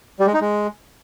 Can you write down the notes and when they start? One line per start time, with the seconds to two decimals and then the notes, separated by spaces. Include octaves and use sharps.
0.20 G3
0.27 G#3
0.34 D#4
0.41 G#3